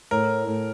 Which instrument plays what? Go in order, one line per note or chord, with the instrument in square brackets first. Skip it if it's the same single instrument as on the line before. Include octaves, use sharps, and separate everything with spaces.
[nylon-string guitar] A2 [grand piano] A#4
[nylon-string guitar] A2